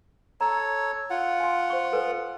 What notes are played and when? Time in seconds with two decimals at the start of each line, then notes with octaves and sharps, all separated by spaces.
0.41 A4 C#5 A#5
1.10 F4 F#5
1.40 G#5 C6
1.70 C5 C#6
1.92 A4 B4 G#5